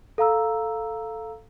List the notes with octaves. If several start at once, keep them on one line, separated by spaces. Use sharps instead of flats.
A4 F5 A#5 E6